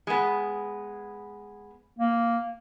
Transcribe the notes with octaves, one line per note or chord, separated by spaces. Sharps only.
G#3 B3
A#3